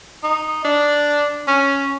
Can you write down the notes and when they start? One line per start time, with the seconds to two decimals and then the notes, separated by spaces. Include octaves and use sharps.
0.23 D#4
0.65 D4
1.48 C#4